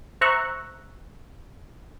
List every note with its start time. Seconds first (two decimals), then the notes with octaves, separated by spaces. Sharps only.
0.21 C5 E5 A#5 C#6 E6 F#6